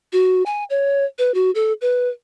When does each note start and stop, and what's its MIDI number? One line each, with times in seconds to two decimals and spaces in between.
0.13 0.43 66
0.46 0.64 80
0.70 1.05 73
1.18 1.34 71
1.34 1.51 66
1.55 1.73 69
1.81 2.09 71